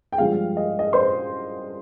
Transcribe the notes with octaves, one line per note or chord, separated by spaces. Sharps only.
G5
G2 F3 G#3 F5
D#5
D#5
C5 C6